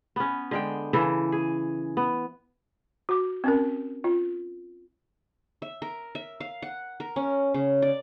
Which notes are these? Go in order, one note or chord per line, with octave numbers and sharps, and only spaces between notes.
B3 C#4
D3 G#3 G5
C#3 E3 A4
G#4
B3
F#4 D6
C4 C#4 A#4
F4
E5
A#4
E5
F5
F#5
A#4
C#4
C#3
D5